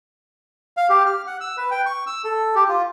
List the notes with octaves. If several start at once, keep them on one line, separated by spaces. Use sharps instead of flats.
F5
G4
F6
F#5
E6
B4
G5
C#6
E6
A4
G4
F4